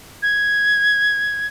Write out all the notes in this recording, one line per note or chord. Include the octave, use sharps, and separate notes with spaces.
G#6